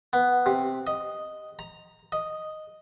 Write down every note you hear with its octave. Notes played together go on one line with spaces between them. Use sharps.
B3
C3
D#5
A#5
D#5